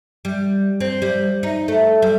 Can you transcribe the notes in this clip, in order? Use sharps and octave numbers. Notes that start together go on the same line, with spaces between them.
G3
C4
G3
D#4
A3
G3